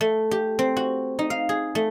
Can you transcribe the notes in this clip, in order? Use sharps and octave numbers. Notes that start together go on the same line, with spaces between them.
A3
G4
C4
F#4
D#4
F5
G#4
A3